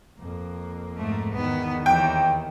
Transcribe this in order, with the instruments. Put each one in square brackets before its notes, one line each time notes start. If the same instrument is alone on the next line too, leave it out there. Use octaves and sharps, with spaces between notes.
[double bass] F2 A#3
[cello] G#2 A3
[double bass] E2 D#3 [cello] B3
[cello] D#2 E3 [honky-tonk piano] G5